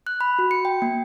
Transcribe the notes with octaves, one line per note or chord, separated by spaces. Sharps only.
F#6
B5
F#4
C#7
G5
A#3